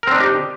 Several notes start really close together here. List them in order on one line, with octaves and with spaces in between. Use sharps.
A#4 C4 D4 D#4 G4